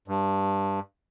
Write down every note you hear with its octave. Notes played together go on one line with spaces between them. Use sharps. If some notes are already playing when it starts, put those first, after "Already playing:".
G2